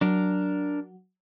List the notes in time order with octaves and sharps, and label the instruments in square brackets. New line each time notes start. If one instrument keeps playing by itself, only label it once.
[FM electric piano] F#3 [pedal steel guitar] D4 A#4